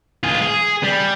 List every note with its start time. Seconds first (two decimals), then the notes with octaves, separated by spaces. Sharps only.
0.24 F4 G#4
0.42 G#4
0.84 G3